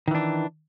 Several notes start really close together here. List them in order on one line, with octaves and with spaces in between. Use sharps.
D#3 E3 D4